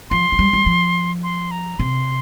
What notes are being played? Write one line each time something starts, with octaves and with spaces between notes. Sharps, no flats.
F3 C6
F3
G3
G3
F3
C6
A#5
C3 C6